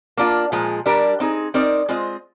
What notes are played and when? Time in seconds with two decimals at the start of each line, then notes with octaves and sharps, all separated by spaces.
0.17 A#3 D4 F4
0.52 A#2 F3 G#3
0.86 G3 D4 G4 A#4
1.20 C4 D#4 G#4
1.54 C4 D#4 A#4 D5
1.89 G#3 C4 F4 C5 D#5